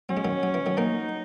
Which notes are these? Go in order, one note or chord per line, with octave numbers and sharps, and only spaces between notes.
F#3 C#4
G#3
D#3 F#3
F#3
E3
D#3 F#3
F#3 A#3 D#4